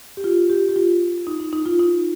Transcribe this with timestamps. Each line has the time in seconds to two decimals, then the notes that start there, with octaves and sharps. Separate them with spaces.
0.17 G4
0.24 F4
0.50 G4
0.69 G4
0.76 F4
1.27 D#4
1.40 D#4
1.53 D#4
1.66 F4
1.79 D#4